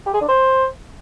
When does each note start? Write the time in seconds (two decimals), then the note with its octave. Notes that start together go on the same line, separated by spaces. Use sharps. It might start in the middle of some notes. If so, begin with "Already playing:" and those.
0.06 G4
0.13 G#4
0.21 D4
0.28 C5